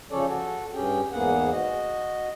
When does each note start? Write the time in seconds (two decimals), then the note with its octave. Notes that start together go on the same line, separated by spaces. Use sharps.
0.11 C#3 F3 C#4 A4 C#5 D5
0.28 F#4 A4
0.74 G2 C#4 G4 G#4 G5
1.12 E2 G#2 A#3 B3 G#4 F#5
1.52 F#4 D#5